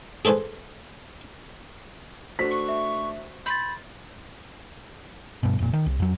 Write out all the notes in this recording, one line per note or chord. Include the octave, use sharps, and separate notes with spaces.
G#4 A4 B4 C5 G#5
A3 D4 F#4 C5 B6
C#6
E5
B5 C6 G6 A6
G2 B2
F1 A#2
D#3
C2
F2 F#3